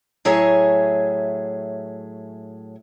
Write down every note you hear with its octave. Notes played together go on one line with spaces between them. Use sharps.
A2 F#3 G#4 C#5 E5 G#5